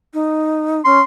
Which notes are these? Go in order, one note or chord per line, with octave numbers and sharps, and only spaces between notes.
D#4
C#4 C6